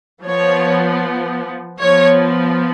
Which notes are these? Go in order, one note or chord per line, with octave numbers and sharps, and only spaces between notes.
F3 B3 C#5
F3 B3 C#5